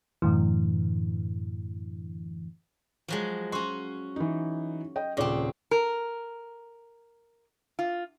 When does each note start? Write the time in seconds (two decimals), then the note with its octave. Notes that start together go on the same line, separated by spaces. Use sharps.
0.22 F#2 A2 D3 E3
3.08 F3 F#3 G#3
3.52 C#4 F#4 C6
4.16 E3 D#4
4.96 D#5 G5
5.17 D#1 C#3 C4 D5 D6
5.71 A#4
7.79 F4